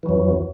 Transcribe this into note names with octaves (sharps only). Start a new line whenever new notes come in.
F2 E3 F#3